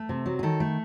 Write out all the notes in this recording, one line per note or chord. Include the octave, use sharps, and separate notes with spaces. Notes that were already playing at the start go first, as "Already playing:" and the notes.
Already playing: A3
C3
F#3
G#4
D#3 A4
A3